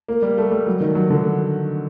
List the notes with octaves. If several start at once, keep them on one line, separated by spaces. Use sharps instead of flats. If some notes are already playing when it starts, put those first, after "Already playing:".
A#3
G3
A3
G3
F#3
D#3
F#3
D3